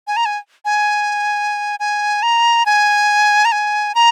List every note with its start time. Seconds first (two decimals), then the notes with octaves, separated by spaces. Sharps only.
0.07 G#5
0.17 A#5
0.25 G#5
0.65 G#5
1.80 G#5
2.23 A#5
2.66 G#5
3.45 A#5
3.52 G#5
3.95 A#5